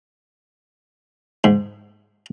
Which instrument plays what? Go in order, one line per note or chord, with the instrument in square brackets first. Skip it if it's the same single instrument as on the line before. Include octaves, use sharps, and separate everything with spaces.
[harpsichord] G#2